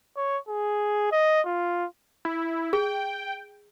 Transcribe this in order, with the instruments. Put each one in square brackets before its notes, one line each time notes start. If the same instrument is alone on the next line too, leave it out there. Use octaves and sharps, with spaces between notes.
[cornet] C#5
G#4
D#5
F4
[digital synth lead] E4
[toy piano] G#4 [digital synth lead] G5